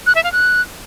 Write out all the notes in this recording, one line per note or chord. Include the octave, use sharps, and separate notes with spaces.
F#6
E5
F5
F#6